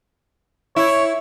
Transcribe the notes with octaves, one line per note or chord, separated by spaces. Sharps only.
E4 C#5